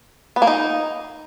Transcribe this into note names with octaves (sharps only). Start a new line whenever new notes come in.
B3
A#3
D#4